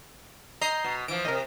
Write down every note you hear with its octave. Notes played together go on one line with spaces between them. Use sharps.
D#5 A#5 G6 C7
B2
E3 F3 D7
A2 C3 A#4 D#5